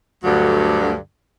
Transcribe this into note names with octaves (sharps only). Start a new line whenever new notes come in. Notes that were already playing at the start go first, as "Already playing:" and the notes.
D2 G2 D3 F#3